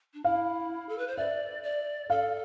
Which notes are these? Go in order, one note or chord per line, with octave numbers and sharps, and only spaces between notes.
D4
E4 F5
A4
B4
C5
D5 E5
D5
A4 F5